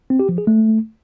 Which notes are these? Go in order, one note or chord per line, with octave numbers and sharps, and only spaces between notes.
C4
G4
F3
G#4
A3